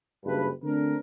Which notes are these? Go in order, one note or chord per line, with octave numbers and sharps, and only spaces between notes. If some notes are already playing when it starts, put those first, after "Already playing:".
F#1 G2 B4
D3 A3 C4 D4 A#4